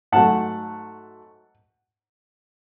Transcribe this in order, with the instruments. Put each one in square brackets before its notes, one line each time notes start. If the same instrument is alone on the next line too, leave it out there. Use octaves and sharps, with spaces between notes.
[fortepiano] G#2 F#3 A3 F#5 A5